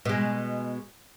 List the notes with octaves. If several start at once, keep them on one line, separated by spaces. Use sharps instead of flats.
B2 G#3